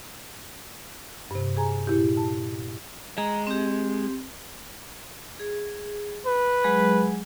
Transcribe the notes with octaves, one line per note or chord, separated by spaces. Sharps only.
G2 C3
G#4 G#5 A#5
A#2 E4 G4
A5
G#3 A#5
C4 G4
G#4
B4
F#3 G#3 G#4